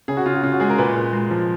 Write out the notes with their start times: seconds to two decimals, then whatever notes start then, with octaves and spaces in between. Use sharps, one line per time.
0.08 C#3 G#4
0.17 F#4
0.26 C#3 F4
0.34 F#4
0.43 C#3 F4
0.52 F#4
0.60 G#3 G#4
0.70 A#4
0.78 A#2 B4
0.96 A#2
1.13 G#3
1.31 F3